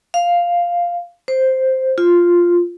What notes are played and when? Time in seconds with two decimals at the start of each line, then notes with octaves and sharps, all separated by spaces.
0.14 F5
1.28 C5
1.98 F4